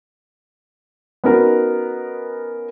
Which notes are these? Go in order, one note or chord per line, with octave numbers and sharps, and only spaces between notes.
B3 C#4 D#4 F#4 A#4 B4